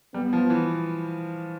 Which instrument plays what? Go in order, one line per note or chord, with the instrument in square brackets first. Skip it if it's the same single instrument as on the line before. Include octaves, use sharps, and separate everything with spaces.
[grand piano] G3 [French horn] B3
[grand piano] F3
E3